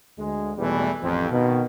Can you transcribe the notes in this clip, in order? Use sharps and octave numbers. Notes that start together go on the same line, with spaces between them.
D2 G#3
G#1 E2 B2 E3 G3 A3
A1 F2 C4
B2 D#3